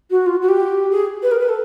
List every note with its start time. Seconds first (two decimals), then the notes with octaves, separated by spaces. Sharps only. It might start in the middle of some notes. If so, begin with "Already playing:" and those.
0.10 F#4
0.26 F4
0.41 F#4
0.48 G4
0.90 G#4
1.22 B4
1.31 A#4
1.39 B4
1.48 A4